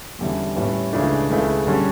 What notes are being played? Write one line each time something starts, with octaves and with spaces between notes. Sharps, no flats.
E2 D3 G3 C#4 E4
A2 G3 C#4 E4 B4
C#2 C#3 E3 A3 D4
C#2 C#3 E3 A3 E4
D3 G3 C#4